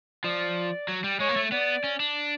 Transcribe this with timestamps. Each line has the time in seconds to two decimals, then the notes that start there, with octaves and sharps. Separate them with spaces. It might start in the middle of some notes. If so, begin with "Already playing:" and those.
0.24 F3 D5
0.88 F#3
1.04 G3
1.20 G#3 C#5
1.29 A#3
1.36 A3
1.52 B3 D5
1.84 C#4
2.00 D4